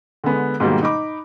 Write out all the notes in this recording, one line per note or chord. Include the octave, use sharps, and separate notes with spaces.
D3 G#3 B3
G#2 B2 D#3 G3 A#3
D#4 B5 D6